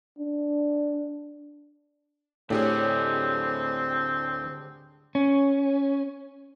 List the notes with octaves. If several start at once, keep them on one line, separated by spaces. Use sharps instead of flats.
D4
D2 A2 C4 D4 G4 G#4 C#5
C#4